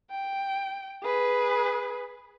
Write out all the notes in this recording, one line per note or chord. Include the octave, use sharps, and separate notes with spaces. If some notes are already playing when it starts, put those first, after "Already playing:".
G5
G#4 B4